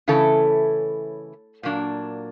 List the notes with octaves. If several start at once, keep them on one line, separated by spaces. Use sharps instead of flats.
C#3 E3 A3 C#4 E4 A4
A#2 F#3 A#3 D4